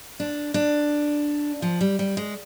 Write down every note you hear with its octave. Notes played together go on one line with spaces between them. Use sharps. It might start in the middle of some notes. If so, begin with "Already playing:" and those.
D4
D4
F3
G3
G3
G#3